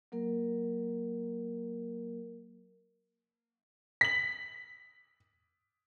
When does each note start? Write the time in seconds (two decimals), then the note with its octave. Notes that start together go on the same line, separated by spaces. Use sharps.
0.12 F#3 A#3 A#4
4.01 B6 F#7